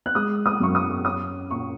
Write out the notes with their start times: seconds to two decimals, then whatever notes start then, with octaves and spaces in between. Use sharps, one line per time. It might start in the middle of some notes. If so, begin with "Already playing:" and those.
0.06 F#6
0.15 G#3 D#6
0.46 D#6
0.60 F#2 C#6
0.75 D#6
1.05 C#4 D#6
1.51 A#2 C#6